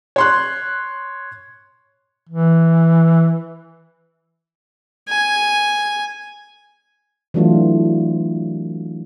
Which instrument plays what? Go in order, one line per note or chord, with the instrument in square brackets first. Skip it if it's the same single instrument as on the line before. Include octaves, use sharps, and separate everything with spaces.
[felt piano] C#5 C6 F#6
[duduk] E3
[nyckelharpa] G#5
[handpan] E3 F#3 A3 D4 F4 F#4